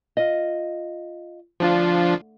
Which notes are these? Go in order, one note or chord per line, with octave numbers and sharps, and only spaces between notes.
F4 D#5
D2 F3 D4 F4